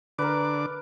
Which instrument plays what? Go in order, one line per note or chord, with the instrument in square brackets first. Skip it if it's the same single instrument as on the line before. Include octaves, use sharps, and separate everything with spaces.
[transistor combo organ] D3 D6 [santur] A#4 B4